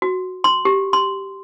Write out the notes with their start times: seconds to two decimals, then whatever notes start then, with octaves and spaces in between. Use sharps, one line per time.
0.02 F#4
0.44 C6
0.65 G4
0.93 C6